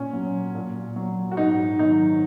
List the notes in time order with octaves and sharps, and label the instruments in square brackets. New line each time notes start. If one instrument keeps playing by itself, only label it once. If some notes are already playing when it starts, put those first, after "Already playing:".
Already playing: [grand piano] A#2 C#4
F#3
A#2
F#3
F#4
G#2 D#4
D#3 F#3 D#4